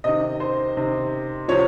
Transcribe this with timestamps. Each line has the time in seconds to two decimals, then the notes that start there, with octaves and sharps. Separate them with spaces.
0.04 C3 D#3 D#5
0.40 C5
0.77 C3 D#3
1.48 C3 F3 C#5